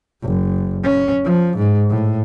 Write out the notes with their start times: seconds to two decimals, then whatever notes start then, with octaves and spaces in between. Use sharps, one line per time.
0.23 F#1
0.84 C#4
1.25 F3
1.57 G#2
1.90 A2